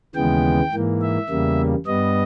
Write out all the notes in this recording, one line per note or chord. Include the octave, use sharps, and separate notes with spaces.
D#2 C#3 E3 G#3 B3 G5
G#2 E3 A#3
E5
E2 C#3 G3 A#3
G2 G3 B3 D#5